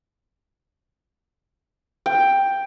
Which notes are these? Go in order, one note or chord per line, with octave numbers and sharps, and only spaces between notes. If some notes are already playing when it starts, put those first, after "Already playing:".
G5